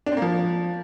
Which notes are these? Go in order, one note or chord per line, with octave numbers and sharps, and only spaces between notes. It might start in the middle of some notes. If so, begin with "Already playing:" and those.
D4
C4
A#3
F3